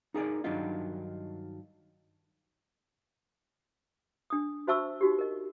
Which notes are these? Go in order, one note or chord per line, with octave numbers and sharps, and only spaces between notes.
D#4 G#4 A#4 D5
G2 D#3 F#3 D4 D#4 F4
D4 D#6
F#4 C5 E5 A5 C#6 E6
D#4 F#4 G4
A#4 D#5